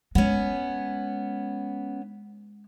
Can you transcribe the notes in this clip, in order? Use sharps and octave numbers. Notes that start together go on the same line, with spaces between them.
G#3 B3 C#4